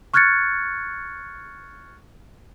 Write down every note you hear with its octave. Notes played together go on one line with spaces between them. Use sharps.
C#6 F6 F#6 G#6 A6 C#7